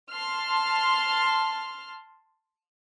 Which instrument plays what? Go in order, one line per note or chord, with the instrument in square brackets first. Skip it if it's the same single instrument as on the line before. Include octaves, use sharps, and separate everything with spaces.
[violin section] A5 C6 F6